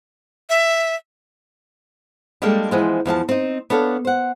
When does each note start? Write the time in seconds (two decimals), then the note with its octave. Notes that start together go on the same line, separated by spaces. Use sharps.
0.50 E5
2.42 G3 G#3 A#3 D4 A4 G5
2.71 E3 F3 G#3 B3 C5
3.06 E2 F3 E5 A5
3.29 C4 D#4
3.70 B3 D4 A4 C#5 F5
4.05 C5 F#5